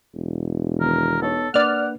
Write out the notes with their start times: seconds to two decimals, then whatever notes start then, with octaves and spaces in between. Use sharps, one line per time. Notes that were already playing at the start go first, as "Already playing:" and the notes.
0.14 E1
0.81 D#3 B3 A#4
1.22 B3 D#4 A4 C#5
1.54 A#3 D4 B4 D5 F#5 F6